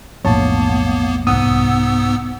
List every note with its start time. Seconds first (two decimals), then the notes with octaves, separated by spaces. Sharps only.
0.25 B1 F2 A2 A#3 B3 C#5 A5
1.27 C2 G#2 B3 F#5 D#6 E6